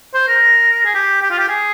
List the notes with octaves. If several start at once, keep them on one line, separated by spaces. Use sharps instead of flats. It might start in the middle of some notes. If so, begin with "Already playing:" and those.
C5
A#4
G#4
G4
G4
F4
G4
G#4